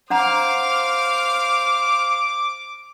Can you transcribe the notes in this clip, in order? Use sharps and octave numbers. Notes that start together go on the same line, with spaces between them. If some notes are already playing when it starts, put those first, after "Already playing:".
D4 C5 F5 F#5 A#5 D6